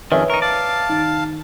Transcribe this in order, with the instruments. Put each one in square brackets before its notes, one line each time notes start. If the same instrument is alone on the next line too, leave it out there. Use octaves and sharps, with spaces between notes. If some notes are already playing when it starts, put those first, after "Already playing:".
[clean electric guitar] F2 D#3 [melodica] C#4 G#4 [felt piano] B4 C#5 E5
[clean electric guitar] D#4 A#4 [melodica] C#6
[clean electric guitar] D5 [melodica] F5 A5
[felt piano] D#3